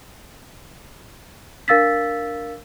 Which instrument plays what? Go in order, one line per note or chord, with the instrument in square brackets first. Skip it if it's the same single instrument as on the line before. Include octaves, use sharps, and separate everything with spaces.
[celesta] D4 A#4 F5 E6 A6 B6